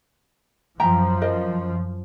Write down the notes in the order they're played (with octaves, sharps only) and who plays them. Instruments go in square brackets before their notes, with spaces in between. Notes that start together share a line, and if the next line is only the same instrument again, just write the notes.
[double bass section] F#2 F3 [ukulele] E5 G5 A#5
[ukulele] A#4 C5 D#5